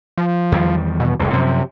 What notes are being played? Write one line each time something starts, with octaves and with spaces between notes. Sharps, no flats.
F3
E2 D#3 G3
B2
F1 C2 F2
F#2 C3 F3